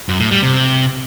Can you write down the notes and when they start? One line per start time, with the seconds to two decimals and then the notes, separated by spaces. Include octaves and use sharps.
0.09 F#2
0.20 A2
0.31 G3
0.42 C3